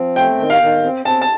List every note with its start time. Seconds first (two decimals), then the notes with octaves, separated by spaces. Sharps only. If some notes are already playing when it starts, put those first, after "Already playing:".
Already playing: F3 C4
0.16 A3 G5
0.39 D#3
0.50 F5
0.62 D#3
0.84 C4
1.05 C4 A5
1.21 A5